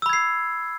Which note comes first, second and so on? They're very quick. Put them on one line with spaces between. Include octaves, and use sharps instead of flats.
E6 B5 G#6 C7